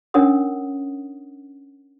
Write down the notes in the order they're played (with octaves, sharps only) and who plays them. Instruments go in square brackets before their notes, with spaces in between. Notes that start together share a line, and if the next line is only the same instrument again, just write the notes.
[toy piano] C#4 D4 A#4 C#5 F#5 D#6